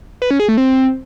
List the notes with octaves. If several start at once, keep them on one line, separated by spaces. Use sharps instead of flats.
B4
C#4
G#4
A3
C4